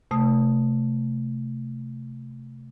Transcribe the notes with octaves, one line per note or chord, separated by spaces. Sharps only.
C3 A3 D#6